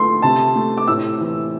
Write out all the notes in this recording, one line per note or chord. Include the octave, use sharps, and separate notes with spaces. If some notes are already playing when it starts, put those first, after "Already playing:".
Already playing: A3 C6
C3 A5
A3
D6
A2 E6
E3